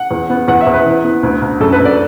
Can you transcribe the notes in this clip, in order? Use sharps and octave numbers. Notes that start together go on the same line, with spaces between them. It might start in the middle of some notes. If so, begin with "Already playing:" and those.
Already playing: F#5
E2
B3
E2 F#5
E5
E2
B4
E3
B3
D2
D2
F#2 A4
B4
F#2
D5